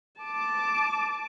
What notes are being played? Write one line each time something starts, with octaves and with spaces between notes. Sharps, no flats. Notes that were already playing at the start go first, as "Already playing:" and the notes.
A5 D6